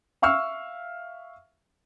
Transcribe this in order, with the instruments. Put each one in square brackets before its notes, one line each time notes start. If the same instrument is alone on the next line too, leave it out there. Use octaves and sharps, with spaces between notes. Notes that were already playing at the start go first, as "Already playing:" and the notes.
[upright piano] E5 F5 C#6 E6 F6